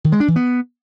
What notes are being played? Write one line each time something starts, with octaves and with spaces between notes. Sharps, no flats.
D#3
G#3
D4
E3
B3